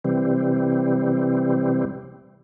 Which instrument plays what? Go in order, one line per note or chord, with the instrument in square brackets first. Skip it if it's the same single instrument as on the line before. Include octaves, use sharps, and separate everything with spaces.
[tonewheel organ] C3 E3 G3 C4